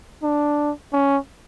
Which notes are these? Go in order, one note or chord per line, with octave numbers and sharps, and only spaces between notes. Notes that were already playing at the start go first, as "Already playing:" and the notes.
D4
C#4